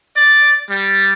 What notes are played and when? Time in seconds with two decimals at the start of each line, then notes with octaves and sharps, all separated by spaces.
0.15 D5
0.69 G3